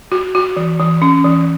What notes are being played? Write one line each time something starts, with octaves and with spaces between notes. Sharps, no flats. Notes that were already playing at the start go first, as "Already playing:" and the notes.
F#4
F#4
E3
E3
C#4
E3